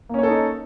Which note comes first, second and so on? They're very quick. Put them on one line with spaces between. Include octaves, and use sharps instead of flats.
A#3 C#4 C#5 A4 D#4